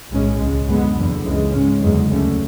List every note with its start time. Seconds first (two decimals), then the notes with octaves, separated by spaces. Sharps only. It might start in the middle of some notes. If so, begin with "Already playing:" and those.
0.10 B1 A2 G#3 C#4
0.38 C#2 C#3 G#3
0.67 F#2 D3 G#3 B3
0.95 F#1 E2 D3
1.24 C#2 C#3 E3 G#3
1.53 G#2 G#3 C#4
1.81 F#1 E2 D3 G#3
2.10 D2 D3 A3 C#4